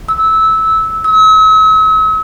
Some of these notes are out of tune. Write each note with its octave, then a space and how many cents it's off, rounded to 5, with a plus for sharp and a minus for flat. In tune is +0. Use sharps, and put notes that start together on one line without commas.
E6 -15
E6 -45